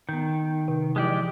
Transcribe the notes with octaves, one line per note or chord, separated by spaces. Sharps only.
D#3 B3 G6
C3
E3 F3 G#3 E4 G4 D5